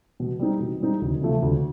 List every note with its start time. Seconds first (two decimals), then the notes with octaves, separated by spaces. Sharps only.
0.20 B2
0.39 G3 C4 D#4
0.60 B2
0.80 G3 C4 D#4
1.01 D2
1.21 C3 F3 A3
1.42 D2